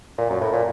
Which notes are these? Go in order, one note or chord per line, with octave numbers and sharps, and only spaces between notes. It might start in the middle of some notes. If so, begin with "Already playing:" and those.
A#2
F#2
A2
A#2